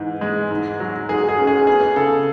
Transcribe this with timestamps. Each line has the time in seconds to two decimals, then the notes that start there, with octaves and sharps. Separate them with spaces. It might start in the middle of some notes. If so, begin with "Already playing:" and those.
Already playing: G#2 E3
0.21 G#3
0.51 G#2
0.80 F#3
1.09 G#2 G#4
1.29 G#4
1.38 C#4
1.47 G#4
1.67 B3 G#4
1.96 C#3 A4